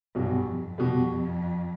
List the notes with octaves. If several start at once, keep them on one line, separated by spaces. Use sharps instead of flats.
B1 G2 B2 G3
F2
B2 G3